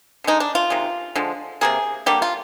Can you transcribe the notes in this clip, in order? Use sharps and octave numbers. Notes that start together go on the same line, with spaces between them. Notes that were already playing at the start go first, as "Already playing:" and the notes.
D3 G#3 D#4
D4
F4
C3 D#3 G#3
D3 F3 G#3
C3 G3 A#3 G#4
D3 G3 A#3 G4
F4